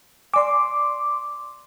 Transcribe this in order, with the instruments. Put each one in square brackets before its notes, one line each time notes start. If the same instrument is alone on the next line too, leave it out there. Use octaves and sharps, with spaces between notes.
[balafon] D5 G#5 [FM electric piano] C6 D6